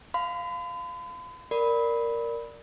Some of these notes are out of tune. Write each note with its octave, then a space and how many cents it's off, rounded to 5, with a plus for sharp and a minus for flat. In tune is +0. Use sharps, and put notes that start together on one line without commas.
F5 +0 B5 +45
A#4 +0 D5 +0 B5 +0